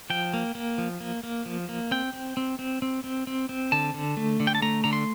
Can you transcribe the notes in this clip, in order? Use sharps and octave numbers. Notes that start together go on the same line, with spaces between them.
F3 G5
A#3
A#3
F3
A#3
A#3
F3
A#3
C4 G5
C4
C4
C4
C4
C4
C4
C4
D3 A5
D3
A3
D3
G5
A5
A3 A#5
D3 A#5
C6